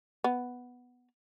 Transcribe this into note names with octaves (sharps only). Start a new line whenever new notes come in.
B3